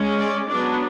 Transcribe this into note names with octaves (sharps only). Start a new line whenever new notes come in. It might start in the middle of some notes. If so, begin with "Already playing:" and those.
Already playing: G#3 C#4
D5
F#3 B3 D4 D5